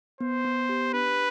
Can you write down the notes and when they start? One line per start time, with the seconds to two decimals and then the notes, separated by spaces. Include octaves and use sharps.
0.20 B3 C5
0.45 B3
0.69 G4
0.94 D4 B4